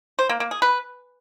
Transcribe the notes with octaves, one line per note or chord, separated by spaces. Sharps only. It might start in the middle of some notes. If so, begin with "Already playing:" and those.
C5
A#3
A#3
G#4
B4